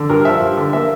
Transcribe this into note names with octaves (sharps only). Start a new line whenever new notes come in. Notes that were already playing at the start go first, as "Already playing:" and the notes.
Already playing: D3
G2 A#4
F3 E5
G2
D3
A#3 E5